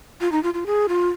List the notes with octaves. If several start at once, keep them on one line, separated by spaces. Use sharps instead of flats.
F4
D#4
F4
F4
G#4
F4